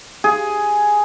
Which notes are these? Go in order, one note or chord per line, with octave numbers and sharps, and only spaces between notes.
G#4